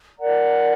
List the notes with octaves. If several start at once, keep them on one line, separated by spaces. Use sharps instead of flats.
A#4 D5 F#5 A#5